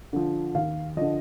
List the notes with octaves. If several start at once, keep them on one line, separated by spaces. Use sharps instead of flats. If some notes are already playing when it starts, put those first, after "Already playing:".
D3 F3
D#2 F5
D3 F3 D#5